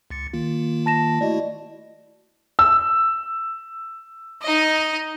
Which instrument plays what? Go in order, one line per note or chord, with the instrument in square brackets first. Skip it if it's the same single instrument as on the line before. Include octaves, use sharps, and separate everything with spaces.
[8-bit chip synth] C#2 A6 C#7
D#3 A#3 F4
[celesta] A5 A#6 E7
[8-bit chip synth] A3 E4 F#4 [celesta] D5 D#5
[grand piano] E6
[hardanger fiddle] D#4 D#5